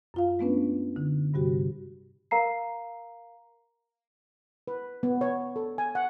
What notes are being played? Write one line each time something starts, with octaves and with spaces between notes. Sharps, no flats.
F#2 F4 F5
G#3 A3 B3 C#4 D4 B4
D3 D#4
G2 C3 G3 F#4 G4
A#4 F5 A#5 C7
B4
B3
C#5
A4
G#5
F#5